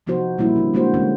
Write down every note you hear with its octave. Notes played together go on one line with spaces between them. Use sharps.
C3 F3 B3 D#4 F#4 C5
A#2 G3 A#3 C#4 E4
D3 D4
G#3 A#3 D4 F#4 C5
D3 G#3 A3 C#4